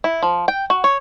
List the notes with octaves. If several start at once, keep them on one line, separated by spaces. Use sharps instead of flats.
E4
F3
G5
F#4
C#5